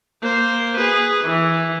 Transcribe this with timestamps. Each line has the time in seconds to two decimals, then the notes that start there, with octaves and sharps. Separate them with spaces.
0.22 A#3 C5
0.77 G#4 B4
1.24 E3